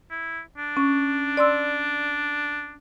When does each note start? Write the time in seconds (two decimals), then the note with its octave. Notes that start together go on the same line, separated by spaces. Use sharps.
0.10 E4
0.58 D4
0.77 C#4
1.37 D5 C6 E6